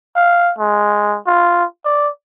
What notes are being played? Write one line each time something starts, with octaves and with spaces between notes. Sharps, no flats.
F5
G#3
F4
D5